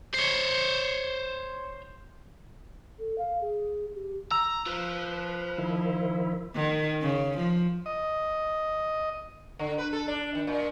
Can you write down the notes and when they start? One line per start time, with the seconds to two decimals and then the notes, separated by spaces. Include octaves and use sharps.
0.14 C5 C#5
2.99 A4
3.18 F5
3.41 G#4
3.95 G4
4.31 A#5 E6
4.66 F4 B4 C5
5.58 D#3 F3 E4
6.55 D#3
7.02 C#3
7.38 F3
7.86 D#5
9.59 D3
9.78 B4
9.93 A4
10.08 D4
10.35 D#3
10.47 A#2